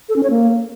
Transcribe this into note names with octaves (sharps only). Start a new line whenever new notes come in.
A4
C#4
C#5
A#3